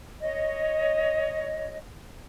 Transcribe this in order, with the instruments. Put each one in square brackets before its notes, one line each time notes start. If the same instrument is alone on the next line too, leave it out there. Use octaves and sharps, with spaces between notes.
[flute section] C#5 D#5